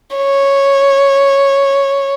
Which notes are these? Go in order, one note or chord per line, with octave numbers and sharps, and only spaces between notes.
C#5